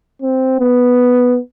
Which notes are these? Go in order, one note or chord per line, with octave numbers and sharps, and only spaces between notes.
C4
B3